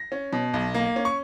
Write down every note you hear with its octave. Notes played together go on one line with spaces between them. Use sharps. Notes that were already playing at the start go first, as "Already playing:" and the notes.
Already playing: A#6
C#4
B2
B1
A#3
C#4
C#6